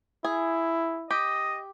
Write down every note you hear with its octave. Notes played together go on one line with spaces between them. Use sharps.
E4 G#4
G4 D#5